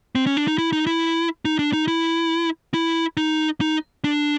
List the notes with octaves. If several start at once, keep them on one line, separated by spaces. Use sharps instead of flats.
C4
C#4
D4
D#4
E4
D#4
E4
D#4
D4
D#4
E4
E4
D#4
D#4
D4